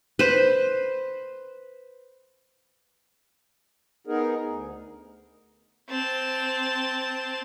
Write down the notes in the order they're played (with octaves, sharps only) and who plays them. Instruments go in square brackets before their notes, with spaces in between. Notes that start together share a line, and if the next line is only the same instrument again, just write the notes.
[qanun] B4 C5
[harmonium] B3 D#4 G#4 A#4
D2
[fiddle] C4 A5